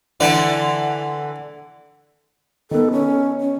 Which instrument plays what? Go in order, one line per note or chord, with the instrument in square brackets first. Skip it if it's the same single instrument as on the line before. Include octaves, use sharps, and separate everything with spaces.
[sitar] D3 E3 [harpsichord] D5 F#5 A5
[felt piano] D#3 B3 [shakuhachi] A4
[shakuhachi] C#4
C#4